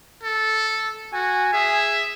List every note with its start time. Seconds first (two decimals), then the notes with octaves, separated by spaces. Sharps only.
0.23 A4
1.13 F#4 G#5
1.53 G#4 E5